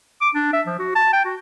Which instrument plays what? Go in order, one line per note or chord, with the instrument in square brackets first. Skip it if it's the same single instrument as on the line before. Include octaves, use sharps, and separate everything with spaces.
[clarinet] D6
D4
E5
F3
F#4
A5
G5
F#4